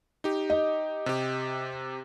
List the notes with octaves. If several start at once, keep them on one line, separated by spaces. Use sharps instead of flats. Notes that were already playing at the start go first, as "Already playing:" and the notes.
D#4 G4
D#5
C3 G4